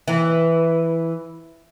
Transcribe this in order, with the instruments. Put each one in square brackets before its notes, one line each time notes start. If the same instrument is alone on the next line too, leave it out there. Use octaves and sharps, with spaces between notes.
[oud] E3